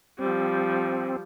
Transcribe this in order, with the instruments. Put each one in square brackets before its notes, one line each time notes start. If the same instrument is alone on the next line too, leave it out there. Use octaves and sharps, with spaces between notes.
[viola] F3 G3 [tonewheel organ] C4